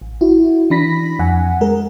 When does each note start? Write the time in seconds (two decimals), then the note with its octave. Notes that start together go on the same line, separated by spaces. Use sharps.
0.01 A1
0.21 E4 F#4
0.70 E3 D4 B5 A#6 B6
1.19 F2 F#5 G#5
1.61 G#3 G#4 A#4